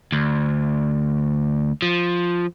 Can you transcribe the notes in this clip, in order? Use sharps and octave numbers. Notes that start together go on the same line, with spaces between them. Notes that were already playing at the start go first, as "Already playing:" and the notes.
D2
F3